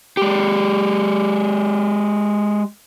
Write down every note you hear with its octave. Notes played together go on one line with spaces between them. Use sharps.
G#3 G4